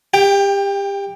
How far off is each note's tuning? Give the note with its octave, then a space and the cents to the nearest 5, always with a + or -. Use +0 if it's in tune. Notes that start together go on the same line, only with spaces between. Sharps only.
G4 +25 G5 +0